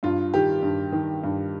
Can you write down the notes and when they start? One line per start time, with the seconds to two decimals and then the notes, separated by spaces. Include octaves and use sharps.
0.03 G2 F4
0.34 D#3 G4
0.63 G2
0.92 D#3
1.24 G2